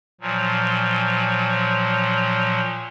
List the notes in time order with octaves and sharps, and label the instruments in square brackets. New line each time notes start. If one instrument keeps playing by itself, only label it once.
[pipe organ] A#2 F3 F#3